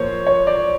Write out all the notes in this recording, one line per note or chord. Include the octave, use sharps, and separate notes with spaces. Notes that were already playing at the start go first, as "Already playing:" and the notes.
Already playing: A#2 F3 A#3 C5 C#5
C#5
D5